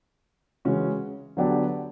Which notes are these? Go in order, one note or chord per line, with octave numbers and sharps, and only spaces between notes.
C#3 E3 G#3 C#4 F#4
D3 F#3 B3 D4 G4